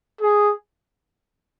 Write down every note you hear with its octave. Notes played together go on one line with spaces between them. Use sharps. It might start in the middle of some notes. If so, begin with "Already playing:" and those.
G#4